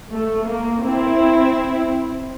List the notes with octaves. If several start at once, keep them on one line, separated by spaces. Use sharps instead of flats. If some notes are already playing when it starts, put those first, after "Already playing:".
A3
A#3
C4 E4